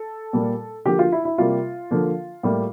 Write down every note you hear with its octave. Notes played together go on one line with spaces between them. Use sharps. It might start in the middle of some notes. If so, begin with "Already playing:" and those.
Already playing: A4
A#2 G3 A#3
D3 F3 A#3 G4
F4
E4
E4
C3 G3 A#3 F4
D3 F3 A#3
A2 G3 A#3